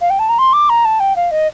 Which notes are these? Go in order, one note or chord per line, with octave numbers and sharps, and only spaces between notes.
F5
G5
A5
A#5
C6
D6
A#5
A5
G5
F5
D#5